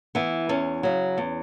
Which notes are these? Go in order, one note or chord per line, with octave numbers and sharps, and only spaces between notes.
E3 B3
E2 C#4
C#3 F#3
E2